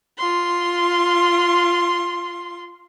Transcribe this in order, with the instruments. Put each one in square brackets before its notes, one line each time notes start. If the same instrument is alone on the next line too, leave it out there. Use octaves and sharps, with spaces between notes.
[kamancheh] F4 C6